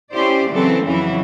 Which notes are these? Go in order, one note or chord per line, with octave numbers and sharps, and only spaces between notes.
C#4 E4 G4 C5 D5
C#3 E3 F#3 C4 A4
F2 C#3 E3 F#3 E4